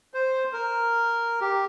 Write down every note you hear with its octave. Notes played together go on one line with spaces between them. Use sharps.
C5
A#4
G4